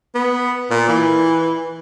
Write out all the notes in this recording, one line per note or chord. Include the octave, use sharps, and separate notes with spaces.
B3
A#2
E3